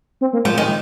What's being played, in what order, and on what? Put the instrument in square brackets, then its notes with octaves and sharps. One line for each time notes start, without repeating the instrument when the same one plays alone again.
[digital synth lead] C4
A#3
[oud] F3 [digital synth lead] G#3
[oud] D#3 [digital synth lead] G#3